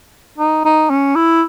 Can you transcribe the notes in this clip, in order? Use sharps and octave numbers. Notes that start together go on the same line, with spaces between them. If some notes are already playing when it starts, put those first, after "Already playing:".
D#4
D#4
C#4
E4